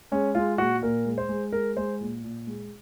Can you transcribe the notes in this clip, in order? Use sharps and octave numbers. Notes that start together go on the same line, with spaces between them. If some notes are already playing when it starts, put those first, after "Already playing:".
G#3 C#4
G#3 F4
A#2 F#4
A#2 A#4
G#3
C5
G#3
G#3 A#4
G#3 C5
A#2
A#2
G#3